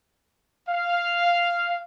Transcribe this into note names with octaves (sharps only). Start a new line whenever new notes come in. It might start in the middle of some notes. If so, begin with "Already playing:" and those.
F5